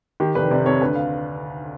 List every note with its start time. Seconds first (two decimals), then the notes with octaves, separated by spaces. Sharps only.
0.20 D#3 G4
0.35 F1 B4
0.51 C3 D5
0.66 F2 C#5
0.81 D2 B4
0.95 F5